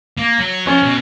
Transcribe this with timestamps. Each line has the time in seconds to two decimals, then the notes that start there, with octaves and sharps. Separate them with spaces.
0.17 A#3
0.39 F#3
0.67 F3 C#4
0.83 B2